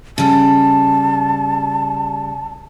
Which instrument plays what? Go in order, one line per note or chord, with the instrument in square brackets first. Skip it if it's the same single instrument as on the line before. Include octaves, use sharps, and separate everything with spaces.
[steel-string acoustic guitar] C#3 G3 [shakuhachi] A5